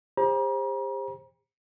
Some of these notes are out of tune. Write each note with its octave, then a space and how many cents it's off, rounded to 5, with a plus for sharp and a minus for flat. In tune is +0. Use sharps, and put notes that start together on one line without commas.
G4 +40 C5 +20 A#5 +40